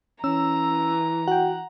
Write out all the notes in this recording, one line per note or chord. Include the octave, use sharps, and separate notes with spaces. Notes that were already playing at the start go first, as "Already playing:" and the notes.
E3 C#4 A#5 E6
F#4 F#5 G5